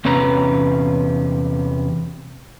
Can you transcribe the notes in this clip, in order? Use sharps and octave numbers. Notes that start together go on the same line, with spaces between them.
E2 C3 C#4 B4 A#5